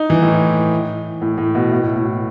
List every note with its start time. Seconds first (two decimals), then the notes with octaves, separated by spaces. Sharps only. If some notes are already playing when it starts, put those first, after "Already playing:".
Already playing: D#4
0.10 E3
0.22 A2
1.22 A2
1.38 A2
1.55 B2
1.72 B2
1.83 A2
1.97 A2